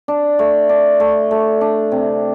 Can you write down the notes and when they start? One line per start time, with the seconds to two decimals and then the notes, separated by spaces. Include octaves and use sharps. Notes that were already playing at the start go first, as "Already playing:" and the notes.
0.08 D4
0.39 A3
0.69 D4
1.00 A3
1.31 A3
1.61 D4
1.92 C3